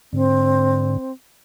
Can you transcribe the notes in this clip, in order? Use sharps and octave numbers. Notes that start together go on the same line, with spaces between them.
G#2 D3 C4